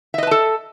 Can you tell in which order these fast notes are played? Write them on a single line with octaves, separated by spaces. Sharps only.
E5 D#5 B4 A5 A4